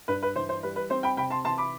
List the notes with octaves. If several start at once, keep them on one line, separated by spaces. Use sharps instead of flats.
G2 B4
B4
E3 C5
C5
G3 B4
B4
C4 C5
G5 B5
C3 G5 B5
A5 C6
E3 A5 C6
B5 D6